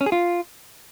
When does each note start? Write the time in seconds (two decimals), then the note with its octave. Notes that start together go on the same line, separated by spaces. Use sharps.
0.01 C#4
0.06 G#4
0.12 F4